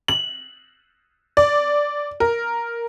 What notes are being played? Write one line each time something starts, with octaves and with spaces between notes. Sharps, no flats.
F#7
D5
A#4